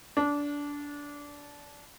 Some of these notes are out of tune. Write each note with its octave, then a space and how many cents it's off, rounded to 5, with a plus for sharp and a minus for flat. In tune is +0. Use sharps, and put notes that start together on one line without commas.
D4 -20